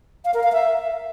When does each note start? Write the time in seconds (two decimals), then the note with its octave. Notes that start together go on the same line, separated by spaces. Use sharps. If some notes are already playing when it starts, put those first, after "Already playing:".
0.25 F5
0.34 A#4
0.43 F5
0.53 E5